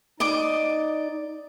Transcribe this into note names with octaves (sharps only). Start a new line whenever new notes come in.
D#4 D5 D#5 D6